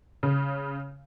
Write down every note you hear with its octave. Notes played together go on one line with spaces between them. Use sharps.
C#3